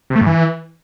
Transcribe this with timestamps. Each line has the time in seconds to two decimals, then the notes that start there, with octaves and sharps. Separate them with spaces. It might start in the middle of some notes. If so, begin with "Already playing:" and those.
0.10 C3
0.16 A3
0.21 G2
0.26 E3